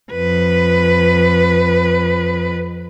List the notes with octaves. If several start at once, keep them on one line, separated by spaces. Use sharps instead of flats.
F2 B4